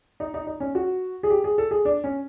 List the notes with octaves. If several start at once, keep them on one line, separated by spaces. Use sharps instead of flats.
D#4
D#4
D#4
C#4
F#4
G#4
G4
G#4
A4
G#4
D4
C#4